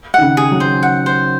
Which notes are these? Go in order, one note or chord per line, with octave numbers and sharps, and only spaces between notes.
D#3 F#5
C#3
G#4
F#3
C5
F#5
C5